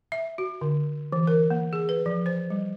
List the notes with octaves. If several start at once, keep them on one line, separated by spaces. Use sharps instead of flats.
E5
F#4
D3
E3
A#4
A#3
G#4
B4
F3
C5
G3